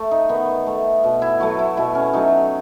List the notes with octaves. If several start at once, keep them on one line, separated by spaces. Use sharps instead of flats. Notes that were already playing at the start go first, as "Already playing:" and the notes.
Already playing: A3
D#4
D#3 B3
A3
B2
E4
F#3 A3 F#4
E4
B2 E4
C#4
F#3 A3 D#4